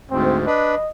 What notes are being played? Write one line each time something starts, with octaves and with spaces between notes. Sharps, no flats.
D2 G#2 C4
D4 B4 D#5